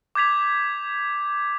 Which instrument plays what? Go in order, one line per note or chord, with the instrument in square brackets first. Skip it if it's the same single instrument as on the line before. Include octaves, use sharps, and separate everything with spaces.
[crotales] D6 G6 G#6 B6 F7